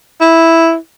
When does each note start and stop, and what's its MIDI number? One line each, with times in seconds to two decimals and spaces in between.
0.21 0.76 64